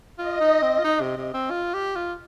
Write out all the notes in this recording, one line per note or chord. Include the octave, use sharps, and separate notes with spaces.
F4 D#5
D#4
C4
F4
D#4
C3
C3
C4
F4
G4
F4